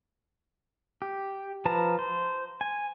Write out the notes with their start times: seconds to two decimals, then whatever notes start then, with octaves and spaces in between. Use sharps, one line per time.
1.02 G4
1.65 F3 B4 A5 A#5
1.99 C5
2.61 G#5